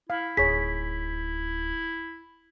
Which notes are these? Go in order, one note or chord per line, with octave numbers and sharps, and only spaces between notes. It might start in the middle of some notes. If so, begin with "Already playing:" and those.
E4 F5
D1 D#4 G#4 C#5 B6